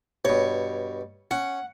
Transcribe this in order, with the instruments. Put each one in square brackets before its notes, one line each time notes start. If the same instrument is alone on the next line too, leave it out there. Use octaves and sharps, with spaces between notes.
[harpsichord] G2 B2 [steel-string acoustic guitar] C#5
[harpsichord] C#4 [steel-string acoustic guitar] F#5